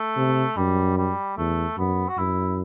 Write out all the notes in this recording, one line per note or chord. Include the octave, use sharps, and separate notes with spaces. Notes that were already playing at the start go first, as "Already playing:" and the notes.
Already playing: A3
C3
F#2 G3
G3
E2 A3
F#2 B3
F#4
F#2 E4